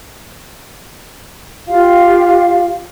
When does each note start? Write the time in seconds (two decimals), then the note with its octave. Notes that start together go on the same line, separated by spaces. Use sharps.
1.67 F4 G4 F5